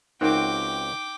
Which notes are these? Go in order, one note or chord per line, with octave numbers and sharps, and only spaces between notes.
C#2 C4 D#4 F#4 A#4 G5 D6